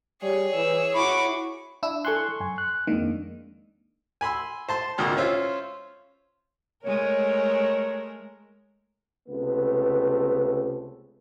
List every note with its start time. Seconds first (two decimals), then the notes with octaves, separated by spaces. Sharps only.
0.22 G3 G#4 C#5
0.55 E3 E6
0.95 E4 F#4 B5 C#6 D6
1.83 D4 E4 E6
2.05 A4 G#5 C6 C#6 F#6
2.40 F#2 G#5
2.58 F#6
2.87 F2 D#3 G#3 A#3 D4
4.21 G#5 B5 C6 E6
4.69 C5 A5 C6
4.98 G#1 D2 A#2 D#6 F6
5.17 C#4 F4 C5 E5
6.84 G#3 A3 A#4 C#5
9.28 C#2 C3 A3 B3